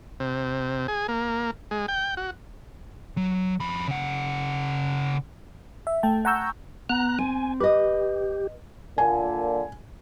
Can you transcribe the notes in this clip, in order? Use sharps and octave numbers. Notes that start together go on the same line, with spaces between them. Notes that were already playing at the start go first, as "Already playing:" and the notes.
C3
G#4
A#3
G#3
G5
F#4
F#3
F2 B5
C#3 F#5
E5
A3 G5 A5
F#5 G#5 A#5 C#6 E6 G6
B3 A#5 F#6
C4 G#5
G4 B4 D#5
A#2 D3 G#5